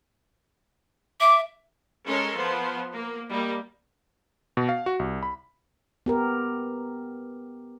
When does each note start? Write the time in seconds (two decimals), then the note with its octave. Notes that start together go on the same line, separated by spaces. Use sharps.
1.20 E5 D6
2.06 G#3 C#4 A4 A#4 C#5 C6
2.36 F3 B3 C5
2.93 A#3
3.29 G3 A#3 D#5
4.57 B2
4.69 F5
4.86 F#4
4.99 C2
5.23 B5
6.06 B3 G4 A#4